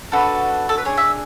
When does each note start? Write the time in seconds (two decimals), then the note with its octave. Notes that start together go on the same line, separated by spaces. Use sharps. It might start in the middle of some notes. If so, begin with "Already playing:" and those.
0.12 D4 F#4 A4 B4
0.69 A4
0.78 B4
0.85 D4 G#4 C#5
0.97 E5